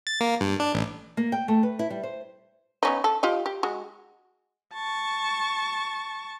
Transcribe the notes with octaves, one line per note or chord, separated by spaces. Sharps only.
A6
A#3
G2
D4
A1
A#3
G5
A3
B4
E4
G3
C5
B3 C#4 D#4
A4
F4 G4 D#5
G4
G#3 F#4
A5 C#6